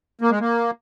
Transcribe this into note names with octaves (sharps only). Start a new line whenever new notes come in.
A#3
G#3
A#3